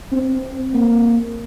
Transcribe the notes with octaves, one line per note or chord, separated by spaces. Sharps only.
C4
A#3